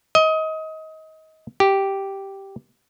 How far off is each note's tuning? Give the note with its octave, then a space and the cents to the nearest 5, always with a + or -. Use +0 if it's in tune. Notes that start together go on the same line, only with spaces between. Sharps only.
D#5 +25
G4 -5